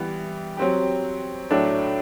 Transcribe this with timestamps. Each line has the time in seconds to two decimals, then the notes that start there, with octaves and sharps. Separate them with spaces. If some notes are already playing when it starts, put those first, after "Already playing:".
Already playing: E3 G3 B3
0.57 F#3 C4 G4
1.51 A2 F#3 A3 D4